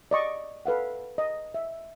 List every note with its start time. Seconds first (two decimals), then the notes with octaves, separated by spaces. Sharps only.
0.11 D5 D#5 C#6
0.66 A4 B4 F5 F#5
1.18 D#5
1.54 E5